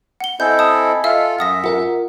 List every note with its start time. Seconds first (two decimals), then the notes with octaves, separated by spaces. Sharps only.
0.20 F#5 G7
0.40 C4 E4 A4 D#5 G#5 G6
0.59 A5 D#6
1.04 F4 A4 E5 F5 E6
1.39 F#2 E5 F#5 D#6 A#6
1.64 F4 A#4 F#5